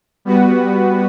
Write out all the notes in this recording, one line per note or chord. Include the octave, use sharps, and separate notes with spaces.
G3 B3 F#4 B4